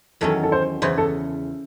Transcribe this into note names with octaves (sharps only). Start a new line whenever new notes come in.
E2 D#3 F#3 C#4 A4
A4
C5
E2 C#3 E3 C5
A4